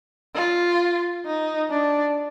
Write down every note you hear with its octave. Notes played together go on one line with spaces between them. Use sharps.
F4
D#4
D4